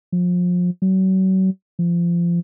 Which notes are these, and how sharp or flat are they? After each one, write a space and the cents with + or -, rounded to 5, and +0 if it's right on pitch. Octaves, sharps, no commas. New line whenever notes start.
F3 +30
F#3 +35
F3 -25